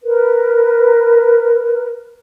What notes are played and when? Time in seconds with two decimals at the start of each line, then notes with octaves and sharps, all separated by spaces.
0.04 A#4 B4